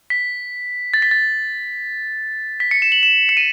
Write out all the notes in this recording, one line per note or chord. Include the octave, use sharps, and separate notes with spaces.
B6
A6
B6
A6
B6
C#7
E7
F#7
E7
C#7
D#7